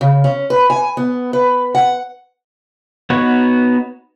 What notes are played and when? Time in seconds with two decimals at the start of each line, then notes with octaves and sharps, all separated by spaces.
0.01 C#3
0.24 C#4
0.50 B4
0.70 G#5
0.97 B3
1.33 B4
1.75 F#5
3.10 B3 D#4 F#4 B4 C#5